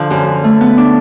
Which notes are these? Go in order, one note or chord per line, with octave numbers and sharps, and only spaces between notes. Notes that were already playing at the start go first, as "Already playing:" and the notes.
Already playing: D3 F3 D4
F#2
F#2
A3
B3
D4